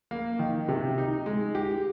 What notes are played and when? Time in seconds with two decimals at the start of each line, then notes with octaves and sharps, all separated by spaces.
0.11 A#3
0.39 D#3
0.69 C3
0.98 D#4
1.26 G#3
1.55 G4